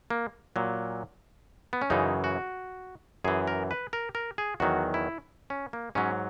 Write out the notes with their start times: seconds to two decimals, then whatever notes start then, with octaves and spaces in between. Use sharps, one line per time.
0.10 A#3
0.56 A#2 F#3
1.73 B3
1.82 C#4
1.90 F#2 C#3 E3 D#4
2.24 F#4
3.24 F#2 E3 G#4
3.47 A#4
3.71 B4
3.93 A#4
4.15 A#4
4.38 G#4
4.60 E2 D#3 F#3 F#4
4.94 E4
5.50 C#4
5.73 A#3
5.95 G#2 F#3 C#4